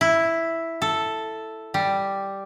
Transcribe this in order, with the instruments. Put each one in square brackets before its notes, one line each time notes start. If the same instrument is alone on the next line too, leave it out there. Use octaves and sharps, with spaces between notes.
[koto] E4
A4
G3